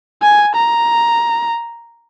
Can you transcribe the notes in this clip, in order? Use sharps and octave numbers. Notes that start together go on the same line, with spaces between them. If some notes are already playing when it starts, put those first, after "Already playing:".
G#5
A#5